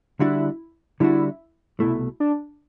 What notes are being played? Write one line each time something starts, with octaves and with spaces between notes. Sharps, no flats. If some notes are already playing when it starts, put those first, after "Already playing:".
D3 G3 D4 E4 F#4
D3 G3 D4 E4 F#4
C2 B2 A3 E4
D4